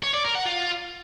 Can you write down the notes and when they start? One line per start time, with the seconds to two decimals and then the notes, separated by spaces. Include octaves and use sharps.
0.04 C#5
0.14 D5
0.25 A#4
0.35 F#5
0.46 F4